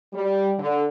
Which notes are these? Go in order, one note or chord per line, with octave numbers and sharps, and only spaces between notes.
G3
D3